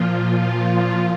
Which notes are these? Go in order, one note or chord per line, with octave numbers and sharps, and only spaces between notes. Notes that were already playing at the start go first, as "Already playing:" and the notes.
Already playing: A#2 F3 F4
A#2 F3 F4